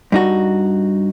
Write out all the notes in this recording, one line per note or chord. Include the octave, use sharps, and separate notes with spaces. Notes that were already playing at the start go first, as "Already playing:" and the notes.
G2 D#4 F#4